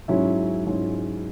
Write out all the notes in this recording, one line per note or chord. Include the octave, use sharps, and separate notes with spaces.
G#2 F#3 C#4 E4
G#2 F#3 C#4 E4